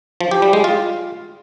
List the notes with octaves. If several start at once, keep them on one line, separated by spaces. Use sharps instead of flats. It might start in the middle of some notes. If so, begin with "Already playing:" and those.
F3
G4
G3
G#3
F4